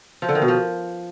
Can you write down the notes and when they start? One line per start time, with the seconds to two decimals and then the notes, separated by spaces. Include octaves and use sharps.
0.22 F3
0.29 D3
0.35 D#3
0.42 B2
0.48 F3